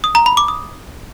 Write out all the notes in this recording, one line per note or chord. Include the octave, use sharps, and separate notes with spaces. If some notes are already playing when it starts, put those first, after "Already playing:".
D#6
A#5
B5
D6
D#6